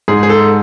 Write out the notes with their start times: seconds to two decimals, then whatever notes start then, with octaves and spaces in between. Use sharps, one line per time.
0.08 G#2 G#4
0.23 G#4
0.29 A4